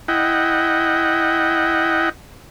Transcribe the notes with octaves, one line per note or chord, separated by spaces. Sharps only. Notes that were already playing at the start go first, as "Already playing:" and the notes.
E4 D#5 F#5 G5